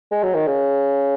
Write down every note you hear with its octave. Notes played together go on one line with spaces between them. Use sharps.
G#3
F#3
D#3
C#3